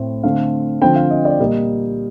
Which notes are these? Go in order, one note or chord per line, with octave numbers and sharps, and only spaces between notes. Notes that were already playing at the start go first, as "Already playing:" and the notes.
Already playing: A2 A3 C4
D3 A3 C4 F5
D3 F3 C4 G5
F5
D#5
D5
A#2 G3 A#3 D#5